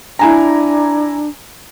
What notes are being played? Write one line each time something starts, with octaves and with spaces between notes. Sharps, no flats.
D4 E4 G#5 A#5